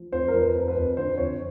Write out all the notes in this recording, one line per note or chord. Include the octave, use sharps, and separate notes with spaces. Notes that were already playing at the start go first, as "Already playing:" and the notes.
Already playing: F3
F2 C5
A#4
F3
B4
F2
B4
F2
D3 C5
F2 C#5